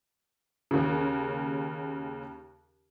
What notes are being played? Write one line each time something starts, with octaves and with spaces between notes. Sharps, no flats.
D#2 C#3